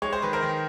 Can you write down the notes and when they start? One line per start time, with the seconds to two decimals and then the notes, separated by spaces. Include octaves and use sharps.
0.02 G#3 C#5
0.13 C5
0.22 D#3 B4
0.33 A#4 C5
0.43 D#3